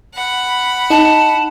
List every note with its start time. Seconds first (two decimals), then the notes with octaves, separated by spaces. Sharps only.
0.14 F#5 B5
0.90 D#4 A5